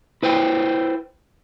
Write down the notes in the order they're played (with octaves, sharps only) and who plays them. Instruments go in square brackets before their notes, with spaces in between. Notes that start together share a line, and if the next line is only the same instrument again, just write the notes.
[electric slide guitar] E4 B4 C5 G5